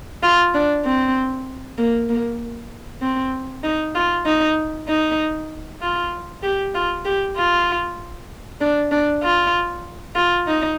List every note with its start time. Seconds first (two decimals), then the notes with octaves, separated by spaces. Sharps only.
0.23 F4
0.54 D4
0.85 C4
1.78 A#3
2.10 A#3
3.02 C4
3.64 D#4
3.95 F4
4.26 D#4
4.89 D#4
5.81 F4
6.43 G4
6.75 F4
7.05 G4
7.36 F4
8.61 D4
8.92 D4
9.23 F4
10.15 F4
10.47 D#4